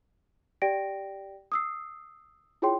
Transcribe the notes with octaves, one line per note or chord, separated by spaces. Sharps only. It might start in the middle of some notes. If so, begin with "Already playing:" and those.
G4 D5 G5 A#6 D7
D#6 E6 C7
E4 F4 G#4 C#5 G5 C6